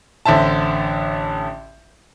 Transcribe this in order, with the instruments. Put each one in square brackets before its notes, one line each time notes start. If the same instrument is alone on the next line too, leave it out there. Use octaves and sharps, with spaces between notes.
[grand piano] A1 D3 C5 E5 A5